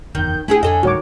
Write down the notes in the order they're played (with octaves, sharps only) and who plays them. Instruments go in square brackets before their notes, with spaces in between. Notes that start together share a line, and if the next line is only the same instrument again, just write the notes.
[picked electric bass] F#1 E2 [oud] D#3 [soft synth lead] G6
[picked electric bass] A3 D4 [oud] E4 G4 G#4 [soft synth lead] G#5
[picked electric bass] F2 [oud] D3 A4 D#5
[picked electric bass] D2 A2 G3 [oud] D#3 [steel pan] F#4 C#5 D6